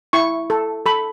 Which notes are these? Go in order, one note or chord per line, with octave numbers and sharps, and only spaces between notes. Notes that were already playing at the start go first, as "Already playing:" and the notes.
E4 C#6
A4
A4 B5